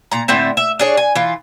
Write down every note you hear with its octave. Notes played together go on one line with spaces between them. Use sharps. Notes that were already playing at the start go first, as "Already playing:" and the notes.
A#2 A#5
A2 D3 C4 E5
E5
D4 G#4 C#5
G#5
E3 F4